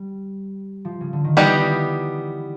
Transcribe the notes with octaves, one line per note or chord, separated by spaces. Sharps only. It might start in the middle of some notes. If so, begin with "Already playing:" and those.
Already playing: G3
F3
C#3
D3
D#3
E3 G3 B3 D#4 G4